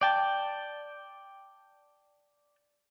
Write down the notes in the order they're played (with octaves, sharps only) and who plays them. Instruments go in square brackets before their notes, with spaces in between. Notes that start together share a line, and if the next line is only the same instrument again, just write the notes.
[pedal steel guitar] D5 G5 A5